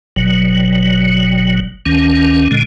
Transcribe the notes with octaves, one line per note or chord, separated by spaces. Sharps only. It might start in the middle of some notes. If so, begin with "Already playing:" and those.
G1 B2 F#3
D2 D#3 C#4
A#2 D3 G#3